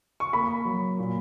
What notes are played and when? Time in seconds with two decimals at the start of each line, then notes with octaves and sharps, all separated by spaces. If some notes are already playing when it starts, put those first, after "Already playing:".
0.20 C#6
0.33 A#3 B5
0.65 F#3
0.99 A#2